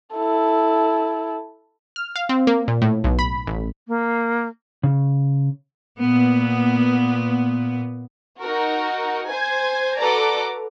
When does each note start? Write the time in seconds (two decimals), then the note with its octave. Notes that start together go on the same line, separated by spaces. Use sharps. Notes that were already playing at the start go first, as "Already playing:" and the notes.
0.15 E4 A4
1.96 F6
2.16 F5
2.29 C4
2.47 A#3
2.68 A#2
2.82 A2
3.04 B1
3.19 B5
3.47 A1
3.88 A#3
4.83 C#3
5.99 A#2 B3
8.39 D#4 F#4 A#4
9.28 C5 G#5 G#6
9.97 F#4 A4 B4 D5 A#5 D6